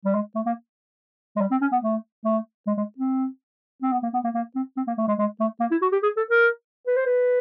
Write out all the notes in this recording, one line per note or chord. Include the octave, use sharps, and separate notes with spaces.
G3
G#3
A3
A#3
G#3
G3
C4
C#4
B3
A3
A3
G#3
G#3
C4
C4
B3
A#3
B3
A#3
A#3
C4
C4
A#3
A3
G#3
G#3
A3
A#3
E4
F#4
G4
G#4
A4
A#4
B4
C5
B4